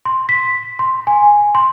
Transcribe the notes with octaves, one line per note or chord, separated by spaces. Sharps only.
C6
B6
C6
G#5
C6